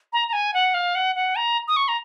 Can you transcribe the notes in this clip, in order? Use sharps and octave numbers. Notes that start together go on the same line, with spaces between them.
A#5
A#5
G#5
F#5
F5
F#5
F#5
A#5
D#6
C#6
A#5